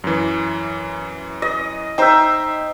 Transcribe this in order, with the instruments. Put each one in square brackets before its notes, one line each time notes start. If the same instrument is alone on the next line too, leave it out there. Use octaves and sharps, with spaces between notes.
[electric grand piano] F#2 E3
[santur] D#5
[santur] D#4 E5 [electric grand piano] C5 G5